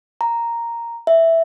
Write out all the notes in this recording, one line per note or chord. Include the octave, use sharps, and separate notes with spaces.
A#5
E5